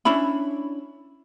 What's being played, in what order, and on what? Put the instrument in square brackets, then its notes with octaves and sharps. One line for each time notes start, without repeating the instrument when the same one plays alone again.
[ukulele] C#4 D4 E4 B5